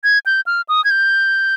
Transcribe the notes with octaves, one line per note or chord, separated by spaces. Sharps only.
G#6
G6
F6
D#6
G#6
G6